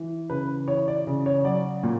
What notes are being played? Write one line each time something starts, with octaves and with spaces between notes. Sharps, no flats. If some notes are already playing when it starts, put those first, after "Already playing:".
Already playing: E3
C#3 B4
E3 C#5
D5
C#3
C#5
F#3 D5
A#2